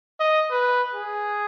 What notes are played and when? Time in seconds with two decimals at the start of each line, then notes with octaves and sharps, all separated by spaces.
0.20 D#5
0.51 B4
0.94 G#4